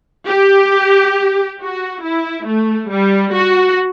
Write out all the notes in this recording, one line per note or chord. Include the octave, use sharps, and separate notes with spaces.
G4
F#4
E4
A3
G3
F#4